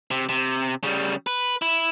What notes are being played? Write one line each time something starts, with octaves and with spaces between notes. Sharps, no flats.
C3
C3
C#3 G3
B4
E4